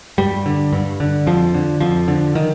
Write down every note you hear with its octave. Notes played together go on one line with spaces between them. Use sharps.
G2 G3
D3
G2
D3
F2 F3
D3
F2 F3
D3
D#3